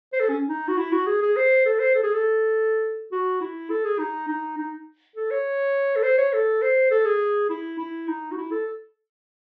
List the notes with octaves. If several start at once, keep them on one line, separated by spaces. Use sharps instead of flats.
C5
A4
C#4
D#4
F#4
E4
F#4
G#4
G#4
C5
A4
C5
A4
G#4
A4
F#4
E4
A4
G#4
D#4
D#4
D#4
A4
C#5
A4
C5
C#5
A4
C5
A4
G#4
E4
E4
D#4
F#4
E4
A4